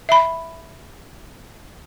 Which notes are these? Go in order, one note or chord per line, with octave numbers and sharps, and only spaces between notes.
E5 B5